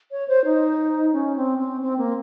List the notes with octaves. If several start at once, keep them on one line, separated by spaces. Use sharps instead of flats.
C#5
C5
D#4
C#4
C4
C4
C4
A#3